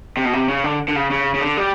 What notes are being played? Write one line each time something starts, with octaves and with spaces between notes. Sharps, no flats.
C3
B2
C3
C#3
D3
D3
C#3
C#3
C#3
D3
G3